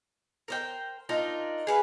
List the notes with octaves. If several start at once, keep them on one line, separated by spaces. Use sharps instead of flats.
A#4 C5 G5
D4 D#4 F4 A#4
G#4 B4 F5